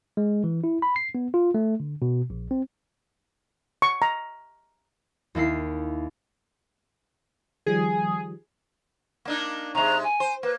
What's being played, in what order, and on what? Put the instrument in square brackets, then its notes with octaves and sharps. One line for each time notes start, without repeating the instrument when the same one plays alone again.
[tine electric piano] G#3
E3
E4
B5
C7
B3
F4
A3
D3
B2
A#1
C4
[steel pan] C#6
A#5
[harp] D#2 A#3 E4 C7
[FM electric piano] D#3 F3 G3 [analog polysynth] G#4
[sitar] A#3 D4 D#4
[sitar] C3 G#3 [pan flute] A#5
[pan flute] G#5
[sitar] C5
[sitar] A#3 [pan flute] B4